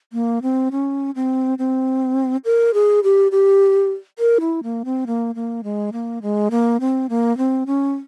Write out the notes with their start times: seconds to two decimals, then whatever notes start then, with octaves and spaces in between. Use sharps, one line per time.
0.13 A#3
0.42 C4
0.72 C#4
1.15 C4
1.58 C4
2.45 A#4
2.74 G#4
3.04 G4
3.32 G4
4.19 A#4
4.40 E4
4.63 A#3
4.85 C4
5.07 A#3
5.35 A#3
5.64 G#3
5.93 A#3
6.22 G#3
6.51 A#3
6.80 C4
7.10 A#3
7.38 C4
7.67 C#4